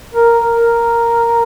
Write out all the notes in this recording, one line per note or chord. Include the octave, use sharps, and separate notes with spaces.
A#4
A#4